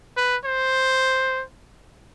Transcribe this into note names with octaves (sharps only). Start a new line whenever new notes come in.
B4
C5